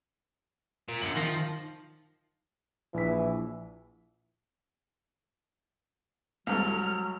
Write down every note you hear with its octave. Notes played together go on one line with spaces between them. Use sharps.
A#2
F#2 D3 C#7 F#7
D#3 F3 A#6 C7
A#1 E3 B6
C2 G#2 F#3 A4 F6